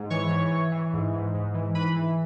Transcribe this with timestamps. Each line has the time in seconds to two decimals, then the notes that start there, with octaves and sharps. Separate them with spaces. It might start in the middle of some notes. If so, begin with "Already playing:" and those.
Already playing: G#2
0.10 E3 C#5 C#6
0.31 E3
0.52 E3
0.72 E3
0.93 G#2
1.14 G#2
1.34 G#2
1.54 E3
1.75 E3 B4 B5
1.96 E3